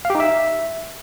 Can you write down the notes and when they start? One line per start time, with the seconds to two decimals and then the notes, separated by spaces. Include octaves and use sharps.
0.05 F5
0.10 G4
0.15 D#4
0.20 E5